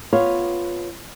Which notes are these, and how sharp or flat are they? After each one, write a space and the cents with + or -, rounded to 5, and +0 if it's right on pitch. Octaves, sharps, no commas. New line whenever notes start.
B3 +0 F4 +0 C#5 +0